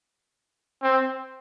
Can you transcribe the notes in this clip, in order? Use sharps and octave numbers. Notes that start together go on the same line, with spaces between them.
C4